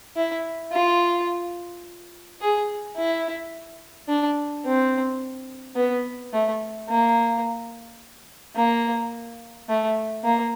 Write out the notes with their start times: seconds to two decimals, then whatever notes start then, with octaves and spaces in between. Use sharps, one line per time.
0.17 E4
0.72 F4
2.41 G#4
2.97 E4
4.08 D4
4.65 C4
5.76 B3
6.33 A3
6.89 A#3
8.56 A#3
9.69 A3
10.24 A#3